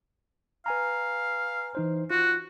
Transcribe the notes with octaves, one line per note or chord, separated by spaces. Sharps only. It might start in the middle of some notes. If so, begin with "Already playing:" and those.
B4 F5 G#5 A#5
E3 D#4 C5
F4 F#4